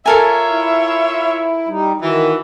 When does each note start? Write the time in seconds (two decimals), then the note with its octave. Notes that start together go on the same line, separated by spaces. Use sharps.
0.06 F4 A4 A#4 C#5 E5 G#5
0.50 E4
1.68 G3 D#4
2.02 D#3 E3 F#4